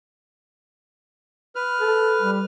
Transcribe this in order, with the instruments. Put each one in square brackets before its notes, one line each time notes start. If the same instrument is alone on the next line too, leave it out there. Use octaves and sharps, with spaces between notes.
[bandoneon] B4 F6
[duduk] A4
G3